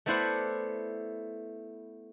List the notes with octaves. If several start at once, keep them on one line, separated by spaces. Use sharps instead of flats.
A3 B3 E4 C5 D5 F#5